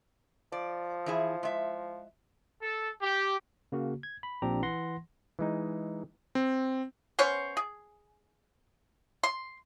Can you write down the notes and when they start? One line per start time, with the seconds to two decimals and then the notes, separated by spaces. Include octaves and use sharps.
0.52 F3 D5
1.06 E3 E4 G#4
1.43 G#3 E5
2.62 A4
3.01 G4
3.72 C#3 A#3 F#4
4.03 G#6
4.23 B5
4.42 A#1 A#2 C4 D4 G4 A#5
4.62 E3 F#5 C6 A#6
5.39 E3 G#3 D#4
6.35 C4
7.19 B3 C#4 C5 C#5
7.57 G#4
9.23 C6